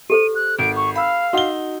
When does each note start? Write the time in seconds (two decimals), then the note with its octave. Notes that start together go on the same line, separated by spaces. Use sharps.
0.10 G4 A4 C5 D#7
0.35 F#6
0.59 G#1 D7
0.76 C#6
0.95 F5 B5 E6
1.33 D#4 F#4 F#5 G7